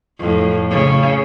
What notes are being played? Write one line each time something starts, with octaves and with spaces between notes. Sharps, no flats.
F2 A2
C#3